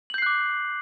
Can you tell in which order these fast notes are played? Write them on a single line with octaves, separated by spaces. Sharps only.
F#7 G6 C7 F#6 D6